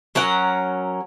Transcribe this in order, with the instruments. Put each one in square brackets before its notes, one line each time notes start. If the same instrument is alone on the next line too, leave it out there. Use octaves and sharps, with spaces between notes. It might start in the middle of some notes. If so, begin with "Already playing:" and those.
[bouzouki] F#3 C#4 A#4 F#5